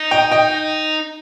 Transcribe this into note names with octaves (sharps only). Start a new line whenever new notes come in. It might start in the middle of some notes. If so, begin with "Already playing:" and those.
Already playing: D#4
D#5 G5
D#5 G5